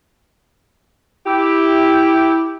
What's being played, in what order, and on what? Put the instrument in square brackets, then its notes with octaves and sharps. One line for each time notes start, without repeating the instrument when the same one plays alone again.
[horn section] E4 G4